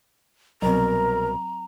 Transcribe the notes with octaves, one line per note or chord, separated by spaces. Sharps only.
C2 B2 F#3 C4 A#4 A#5